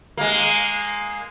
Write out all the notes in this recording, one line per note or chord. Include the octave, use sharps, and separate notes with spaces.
G#3 A#3